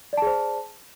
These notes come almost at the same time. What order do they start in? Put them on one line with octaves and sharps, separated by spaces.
D5 A5 G#4 C5